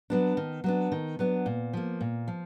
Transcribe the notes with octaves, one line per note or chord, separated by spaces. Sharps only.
F#3 B3 D4
D#3
F#3 B3 D4
D#3
F#3 B3 D4
A#2
F3 A#3
A#2
F3